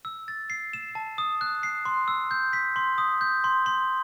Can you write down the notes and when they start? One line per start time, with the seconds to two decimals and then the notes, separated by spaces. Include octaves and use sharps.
0.05 E6
0.28 A6
0.50 C7
0.73 E7
0.95 A5
1.18 D#6
1.41 F#6
1.63 C7
1.85 C6
2.08 E6
2.31 G6
2.53 B6
2.76 C6
2.98 D#6
3.21 G6
3.44 C6
3.66 C6